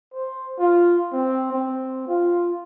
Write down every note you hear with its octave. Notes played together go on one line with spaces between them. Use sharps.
C5
F4
C4
C4
F4